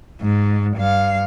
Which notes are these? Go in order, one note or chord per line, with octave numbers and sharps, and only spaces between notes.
G#2
G2 F5